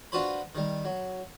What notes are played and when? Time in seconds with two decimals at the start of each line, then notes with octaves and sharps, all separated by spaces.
0.12 D4 F4 F#4 B4 C5 B5
0.55 D#3 G3
0.85 F#3